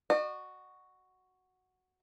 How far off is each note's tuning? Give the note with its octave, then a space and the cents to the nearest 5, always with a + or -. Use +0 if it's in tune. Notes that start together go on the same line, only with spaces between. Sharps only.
F#4 +0 D#5 -45